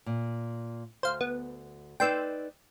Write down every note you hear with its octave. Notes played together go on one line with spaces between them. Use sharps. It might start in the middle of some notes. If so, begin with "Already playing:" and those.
A#2
D2 C5 F5
B3
D#4 B4 D5 G5 C6 E6